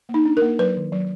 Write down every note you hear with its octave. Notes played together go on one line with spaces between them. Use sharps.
A#3
D#4
D4
A#4
A#3
F#3 B4
D#3
F#3